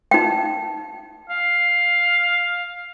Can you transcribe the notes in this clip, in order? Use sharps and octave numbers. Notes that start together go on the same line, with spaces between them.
D#4 G5
F5